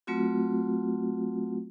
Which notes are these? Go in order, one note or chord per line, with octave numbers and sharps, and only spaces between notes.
F#3 A3 C4 F4 F#4